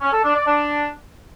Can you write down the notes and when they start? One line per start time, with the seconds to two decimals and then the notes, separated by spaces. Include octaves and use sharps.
0.01 C#4
0.12 A4
0.24 D4
0.35 D5
0.46 D4